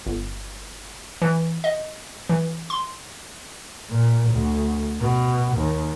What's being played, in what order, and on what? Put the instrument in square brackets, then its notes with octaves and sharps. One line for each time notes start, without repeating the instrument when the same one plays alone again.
[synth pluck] G1
E3
D#5
E3
C6
[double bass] A#2
D2
B2
D#2